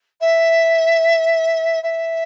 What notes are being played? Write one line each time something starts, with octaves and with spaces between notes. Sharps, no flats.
E5
E5